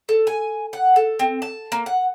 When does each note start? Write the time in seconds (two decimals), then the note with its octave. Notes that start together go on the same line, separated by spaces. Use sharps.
0.09 A4
0.27 G#5
0.73 F#5
0.96 A4
1.19 C4
1.42 A5
1.72 A#3
1.86 F#5